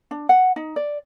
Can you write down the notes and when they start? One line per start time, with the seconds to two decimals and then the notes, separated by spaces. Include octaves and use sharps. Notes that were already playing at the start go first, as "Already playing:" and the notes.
0.11 D4
0.29 F#5
0.56 D#4
0.76 D5